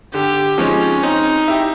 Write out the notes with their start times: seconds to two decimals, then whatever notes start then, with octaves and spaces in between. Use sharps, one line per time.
0.14 D3 G4
0.58 F3 G#3 C4 C#4 D#4
1.03 C4 D#4
1.48 E4 G4